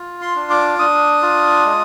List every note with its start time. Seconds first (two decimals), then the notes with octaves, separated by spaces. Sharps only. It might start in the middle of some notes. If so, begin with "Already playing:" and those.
Already playing: F4
0.22 C6
0.36 D4
0.50 D6
0.79 D4 D#6
1.22 F4
1.66 G#3